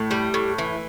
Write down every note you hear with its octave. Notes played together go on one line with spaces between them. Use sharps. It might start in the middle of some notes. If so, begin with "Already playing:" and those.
Already playing: A2 A3
G3
A2
E3